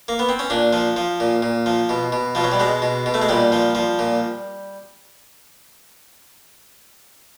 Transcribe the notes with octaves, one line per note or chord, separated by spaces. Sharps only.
A#3
B3
C4
C#4
A#2 D4
F3
F3
A#2
A#2
F3
B2
B2
B2 F3
F#3
G3
B2 G#3
B2
B2
A3
G#3
A#2 G3
F3
F3
A#2